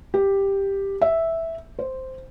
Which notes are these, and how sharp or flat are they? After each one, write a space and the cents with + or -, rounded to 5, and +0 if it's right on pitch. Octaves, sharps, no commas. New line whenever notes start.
G4 +5
E5 -5
C5 -5